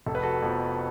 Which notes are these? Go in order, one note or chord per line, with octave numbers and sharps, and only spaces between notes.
F1 A4
B4
F#4 A4
F2 F3 B3